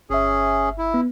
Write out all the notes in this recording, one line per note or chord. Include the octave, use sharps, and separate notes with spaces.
G1 C#4 G#4 E5
E4
B3